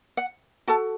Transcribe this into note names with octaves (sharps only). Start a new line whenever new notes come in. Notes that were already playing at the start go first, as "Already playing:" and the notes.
F#5
F#4 A4 A5